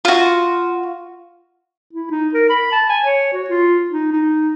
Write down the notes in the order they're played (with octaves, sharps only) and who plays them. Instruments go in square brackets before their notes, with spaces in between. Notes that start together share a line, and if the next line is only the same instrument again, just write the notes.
[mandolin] F4 F#4
[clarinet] E4
D#4
A#4
B5
A5
G#5
C#5
F#4
F4
D#4
D#4